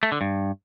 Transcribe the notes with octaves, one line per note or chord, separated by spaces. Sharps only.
A3
D3
G2